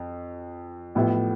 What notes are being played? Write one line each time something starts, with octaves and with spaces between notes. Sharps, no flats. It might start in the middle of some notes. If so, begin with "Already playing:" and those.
Already playing: F2
A1 A2 F3 B3 E4